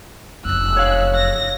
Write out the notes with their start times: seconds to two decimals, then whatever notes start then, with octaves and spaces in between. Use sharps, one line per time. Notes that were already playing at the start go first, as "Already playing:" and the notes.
0.45 F1 F#2 E6 F#6
0.77 C#5 F5
1.15 A#6